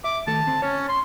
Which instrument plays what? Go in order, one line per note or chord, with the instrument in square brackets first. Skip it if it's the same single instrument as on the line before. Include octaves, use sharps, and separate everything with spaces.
[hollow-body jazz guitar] E5 [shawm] D6
[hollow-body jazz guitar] D#3 A3 A4 [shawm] A5
[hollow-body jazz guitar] D3 C4
[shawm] C#4 [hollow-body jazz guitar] C#5
[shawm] C6